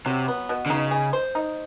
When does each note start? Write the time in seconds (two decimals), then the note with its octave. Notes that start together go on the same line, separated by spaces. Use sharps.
0.06 C3 F#3
0.28 B3
0.49 B2
0.66 D3
0.70 C#3 D#4
0.91 G#4
1.13 C5
1.35 D#4